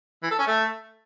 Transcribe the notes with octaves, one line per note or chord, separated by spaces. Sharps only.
E3
A4
C#4
A3